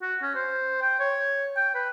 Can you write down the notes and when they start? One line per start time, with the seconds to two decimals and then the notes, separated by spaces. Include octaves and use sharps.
0.02 F#4
0.22 C#4
0.35 C5
0.82 G5
1.00 C#5
1.56 G5
1.75 B4